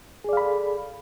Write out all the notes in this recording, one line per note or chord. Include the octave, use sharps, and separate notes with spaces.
G#4 A4 D5 F5 B5